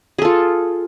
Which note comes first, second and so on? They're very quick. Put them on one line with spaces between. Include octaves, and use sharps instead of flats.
G#4 A4 F4